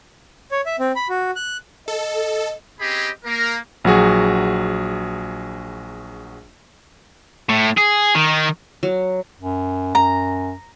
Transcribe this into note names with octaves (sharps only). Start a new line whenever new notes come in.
C#5
E5
C4
B5
F#4
F#6
A4 D#5
C4 C#4 G4 G#4 D#5 B5
A#3 A#4
A#1 F#3 F#4 G#4
A2
G#4
D#3
F#3
F#2
F#2 A#5